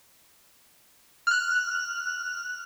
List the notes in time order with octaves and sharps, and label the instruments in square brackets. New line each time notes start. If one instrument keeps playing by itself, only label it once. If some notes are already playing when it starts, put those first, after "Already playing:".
[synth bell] F6 F#6